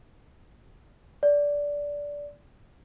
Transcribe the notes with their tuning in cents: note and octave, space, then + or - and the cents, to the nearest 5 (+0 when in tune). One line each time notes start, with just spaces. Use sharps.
D5 -15